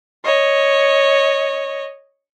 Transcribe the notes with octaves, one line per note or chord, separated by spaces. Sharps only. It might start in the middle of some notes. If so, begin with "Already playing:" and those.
C#5 D#5